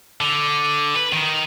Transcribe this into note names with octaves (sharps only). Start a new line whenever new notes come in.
D3
B4
D#3